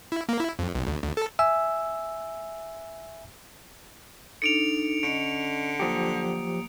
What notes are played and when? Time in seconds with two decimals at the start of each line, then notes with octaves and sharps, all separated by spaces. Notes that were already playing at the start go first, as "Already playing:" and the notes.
0.12 E4
0.29 A#3
0.40 E4
0.59 F2
0.75 B1
0.87 D2
1.03 D2
1.17 A4
1.39 E5 G#5 E6
4.42 D4 D#4 A4 C#7 D7 F7
5.03 D3 C#4 D#5 D7
5.80 F3 F#3 A#3 G4 D#6